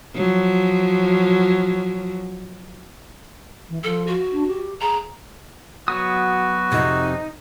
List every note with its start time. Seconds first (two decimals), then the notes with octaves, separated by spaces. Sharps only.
0.15 F3 F#3
3.69 E3
3.84 F3 A4
4.07 F#4
4.32 D4
4.47 G4
4.81 G#4 A#5
5.88 F#3 B3 F#4 D#6
6.72 F2 C3 D#4